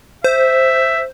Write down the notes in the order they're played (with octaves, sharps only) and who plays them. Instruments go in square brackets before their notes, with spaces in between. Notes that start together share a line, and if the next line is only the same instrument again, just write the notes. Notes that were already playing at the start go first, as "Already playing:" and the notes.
[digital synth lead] C5 [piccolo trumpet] E5